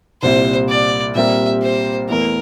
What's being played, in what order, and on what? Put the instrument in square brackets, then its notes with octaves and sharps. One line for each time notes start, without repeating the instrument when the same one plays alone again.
[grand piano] C2 A#2 G3 C4 E4 [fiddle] C5
[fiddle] D5
[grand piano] A#2 G3 C4 G4 A#4 [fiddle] E5
[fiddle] C5
[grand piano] E2 E3 A3 [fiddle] A#4